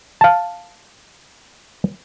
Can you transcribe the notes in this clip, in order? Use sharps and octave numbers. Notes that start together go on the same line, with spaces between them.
F5 A5